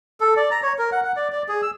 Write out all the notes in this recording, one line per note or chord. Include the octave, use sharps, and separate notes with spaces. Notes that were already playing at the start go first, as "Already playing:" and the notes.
A4
D5
A#5
C#5
A#4
F#5
F#5
D5
D5
G#4
E6